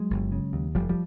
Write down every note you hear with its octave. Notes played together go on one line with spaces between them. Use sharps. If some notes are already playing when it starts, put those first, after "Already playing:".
Already playing: F#3 G#3
G1
C#3
D#2
F1 F3 G3
F3 G3